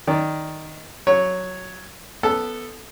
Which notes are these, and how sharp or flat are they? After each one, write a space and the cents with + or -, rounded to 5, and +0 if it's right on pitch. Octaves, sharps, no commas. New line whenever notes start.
D#3 +0 D5 +0
F#3 +0 C#5 +0
B3 +0 A4 +0